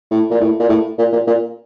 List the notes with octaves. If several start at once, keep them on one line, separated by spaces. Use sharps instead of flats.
A2
A#2
A2
A#2
A2
A#2
A#2
A#2